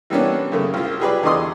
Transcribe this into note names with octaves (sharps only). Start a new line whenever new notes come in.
E3 G3 A#3 B3 C#4 D4
F#2 C#3 A3
C2 F4
G4 G#4 B4 D5
E2 D3 D5 D#5 C6 D#6